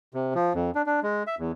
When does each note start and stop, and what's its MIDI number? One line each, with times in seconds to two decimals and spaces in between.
0.14 0.34 48
0.35 0.53 53
0.55 0.71 41
0.75 0.82 62
0.86 1.00 62
1.03 1.23 56
1.27 1.35 76
1.39 1.52 40